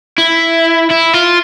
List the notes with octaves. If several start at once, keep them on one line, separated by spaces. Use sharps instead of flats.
E4
E4
F4